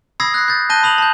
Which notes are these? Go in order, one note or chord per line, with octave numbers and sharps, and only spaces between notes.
B5 D#6 E6 G#6 A#6 C7
F#6 A#6 C7
G6 A6
A5 F#6 G6 A#6 D#7 G7
B5 D#6 F7 F#7
A5 G6